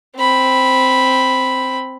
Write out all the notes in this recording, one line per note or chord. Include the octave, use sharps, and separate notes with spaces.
C4 B5